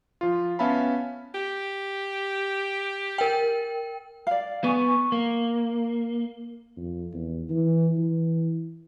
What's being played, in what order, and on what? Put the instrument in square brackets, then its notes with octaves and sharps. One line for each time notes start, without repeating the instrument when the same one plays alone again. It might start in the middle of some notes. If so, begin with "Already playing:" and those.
[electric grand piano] F3 F4
B3 C#4 E5 F5 A5 B5
[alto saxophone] G4
[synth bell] A#4 G5
[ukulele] D5 F5
[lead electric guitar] B3 [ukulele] G#4 G#5 [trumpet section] C#6
[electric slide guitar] A#3
[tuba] F2
E2
E3
E3